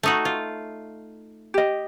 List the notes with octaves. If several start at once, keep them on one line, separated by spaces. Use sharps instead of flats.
A3 D#4 F#4
F4
G4 D#5